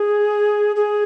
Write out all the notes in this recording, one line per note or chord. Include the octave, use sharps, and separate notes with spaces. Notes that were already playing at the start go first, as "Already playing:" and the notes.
Already playing: G#4
G#4